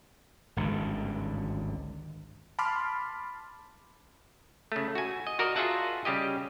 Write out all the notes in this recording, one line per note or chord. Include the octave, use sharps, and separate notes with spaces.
G#1 C#2 G2 D3
A5 B5 C6 D6 F6 B6
C#3 A3
F#4 G#5
D#5
F#4 A#4 D5 D#5
F4 F#4 G#4 E5 F#5 A5
C#3 G3 G4 D#5